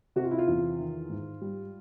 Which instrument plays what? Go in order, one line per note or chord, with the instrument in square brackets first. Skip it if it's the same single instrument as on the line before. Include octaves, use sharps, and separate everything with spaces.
[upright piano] C3 [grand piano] F#4
[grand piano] F4
E4
F4
[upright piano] E2
D#3
G#2
G3